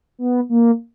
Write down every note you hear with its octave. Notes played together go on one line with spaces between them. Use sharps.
B3
A#3